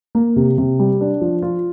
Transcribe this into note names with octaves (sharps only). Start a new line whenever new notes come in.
A#3
C3
C3
G3
D4
F3
F4